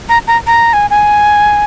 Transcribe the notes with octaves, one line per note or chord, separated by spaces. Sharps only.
A#5
A#5
A#5
G#5
G#5